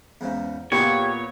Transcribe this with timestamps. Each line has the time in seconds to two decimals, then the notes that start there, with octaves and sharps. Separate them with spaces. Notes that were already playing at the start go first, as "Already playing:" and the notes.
0.21 E2 G#2 C#3
0.72 A#2 B3 F4 G4 G#4 C#5 D#5